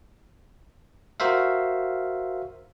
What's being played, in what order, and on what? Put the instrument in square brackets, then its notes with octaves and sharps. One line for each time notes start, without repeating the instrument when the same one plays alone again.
[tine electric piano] F#4 A#4 C5 E5 F5